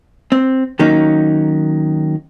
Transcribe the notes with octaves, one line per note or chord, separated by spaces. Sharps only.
C4
D#3 F#3 A#3 C#4 D#4